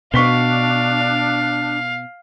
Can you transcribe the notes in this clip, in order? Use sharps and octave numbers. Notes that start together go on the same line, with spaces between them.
B2 D4 F5 C#6 B6 G7